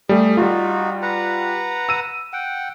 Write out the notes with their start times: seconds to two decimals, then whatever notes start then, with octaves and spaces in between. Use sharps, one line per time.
0.09 G3 A3 G#4
0.37 G3 D#4 F4 F#4
1.02 B4 F#5 A#5
1.89 E6 D#7
2.33 F#5 G5